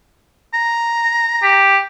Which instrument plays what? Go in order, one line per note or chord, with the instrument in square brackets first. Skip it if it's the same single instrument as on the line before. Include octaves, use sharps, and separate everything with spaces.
[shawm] A#5
[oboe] G4